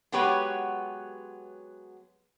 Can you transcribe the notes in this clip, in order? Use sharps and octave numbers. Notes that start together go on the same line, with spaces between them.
F#3 G#3 B3 G4 B4 C#5